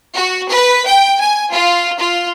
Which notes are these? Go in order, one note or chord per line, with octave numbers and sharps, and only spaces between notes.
F#4
B4
G5
G#5
F4
F4